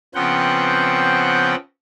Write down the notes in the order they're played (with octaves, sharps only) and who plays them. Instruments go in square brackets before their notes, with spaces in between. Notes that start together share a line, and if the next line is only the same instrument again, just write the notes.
[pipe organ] C#3 F3 B3 C4 F#5 G5